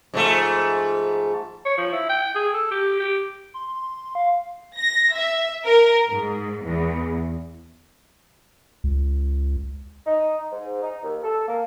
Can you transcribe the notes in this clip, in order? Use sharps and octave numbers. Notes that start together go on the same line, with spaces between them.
G#2 F3 A3
C#5
F3
E4
G5
G#4
A4
G4
G4
C6
F5
A#6
E5
A#4
G#2
E2
C#2
D#4
G#2
D#4
D#2
A4
A#3